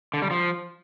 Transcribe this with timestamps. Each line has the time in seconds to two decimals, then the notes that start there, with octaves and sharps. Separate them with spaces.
0.14 D3
0.22 G3
0.31 F3